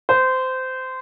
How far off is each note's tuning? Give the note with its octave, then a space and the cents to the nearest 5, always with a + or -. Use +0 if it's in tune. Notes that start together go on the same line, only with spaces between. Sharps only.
C5 -20